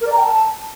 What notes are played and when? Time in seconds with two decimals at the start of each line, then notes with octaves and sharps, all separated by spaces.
0.01 A#4
0.07 D5
0.12 A#5
0.17 G5
0.23 A5